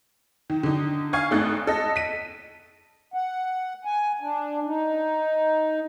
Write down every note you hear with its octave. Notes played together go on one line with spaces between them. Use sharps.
D#3
D3 D#4
F5 G#5 C#6 G#6
G#1 A3 D#4 F#6 A6
A4 D#5
B6 D#7
F#5
G#5
D4
D#4